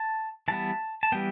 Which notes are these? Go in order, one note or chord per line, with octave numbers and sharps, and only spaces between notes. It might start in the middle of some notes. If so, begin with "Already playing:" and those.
Already playing: A5
E3 G3 B3 A5
A5
E3 G3 B3 G5